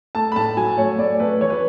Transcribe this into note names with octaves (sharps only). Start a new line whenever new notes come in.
A3 A5
B5
A2 A5
F#3 G#5
A3 C#5
A3 D5
A3 B4
E3 C#5
B4